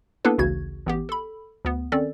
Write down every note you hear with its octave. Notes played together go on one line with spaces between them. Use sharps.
A#3 B3 D4 E4 A4 B4
A1 D2 C#3 F#4 G#6
A1 B3 G4
A4 B5
D2 B3
D#3 C4 C#4 A4 D5